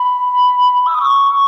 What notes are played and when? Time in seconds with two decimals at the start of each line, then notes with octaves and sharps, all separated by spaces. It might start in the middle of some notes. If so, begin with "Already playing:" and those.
Already playing: B5
0.86 E6
0.94 D#6
1.01 C#6